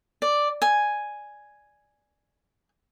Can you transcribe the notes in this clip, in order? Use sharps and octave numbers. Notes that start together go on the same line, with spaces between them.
D5
G#5